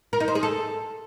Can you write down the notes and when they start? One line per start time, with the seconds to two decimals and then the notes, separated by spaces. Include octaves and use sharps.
0.13 A#4
0.20 D#4
0.28 C5
0.35 G#4
0.43 A4